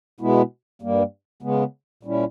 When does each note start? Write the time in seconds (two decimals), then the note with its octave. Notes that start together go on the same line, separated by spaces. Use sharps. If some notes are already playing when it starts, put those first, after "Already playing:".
0.20 B2 G#3 B3 E4
0.82 G2 G3 A#3
1.42 C#3 G#3 B3
2.03 A#2 G3 C#4 E4